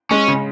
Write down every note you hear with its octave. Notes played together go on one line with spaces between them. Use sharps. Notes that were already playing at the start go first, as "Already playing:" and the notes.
G#3 C#4
C#3